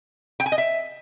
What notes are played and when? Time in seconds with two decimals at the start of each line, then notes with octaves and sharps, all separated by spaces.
0.40 G5
0.46 G#5
0.52 D#5
0.58 E5